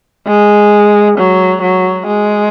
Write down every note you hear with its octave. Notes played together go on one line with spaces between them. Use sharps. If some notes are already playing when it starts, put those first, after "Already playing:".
G#3
F#3
F#3
G#3